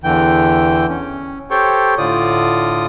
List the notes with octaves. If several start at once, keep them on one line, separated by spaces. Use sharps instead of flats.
E2 D3 E3 G5
C#4
G4 A4 C5 C#5 G5 C#6
A2 D3 F4 D5 D#6